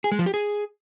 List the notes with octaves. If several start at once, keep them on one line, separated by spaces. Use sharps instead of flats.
G#4
G#3
F3
G4
G#4